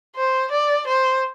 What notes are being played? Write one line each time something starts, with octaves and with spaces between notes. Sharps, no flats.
C5
D5
C5